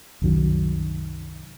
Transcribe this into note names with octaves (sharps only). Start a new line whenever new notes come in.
C2 F#2 D#3 F#3